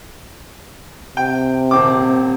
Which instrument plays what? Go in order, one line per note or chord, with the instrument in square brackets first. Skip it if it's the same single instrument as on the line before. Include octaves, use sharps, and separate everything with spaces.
[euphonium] C3 [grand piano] G5
[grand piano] D#1 C4 D6